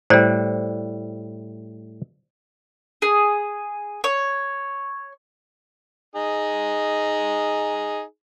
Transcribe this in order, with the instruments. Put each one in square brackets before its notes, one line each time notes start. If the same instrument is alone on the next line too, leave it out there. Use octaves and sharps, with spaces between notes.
[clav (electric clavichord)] A2 G3 [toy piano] C5 D5
[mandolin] G#4
C#5
[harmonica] D#4 G#4